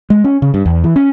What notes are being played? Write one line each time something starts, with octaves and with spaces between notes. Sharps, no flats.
G#3
C#4
C#3
G2
E2
E3
C#4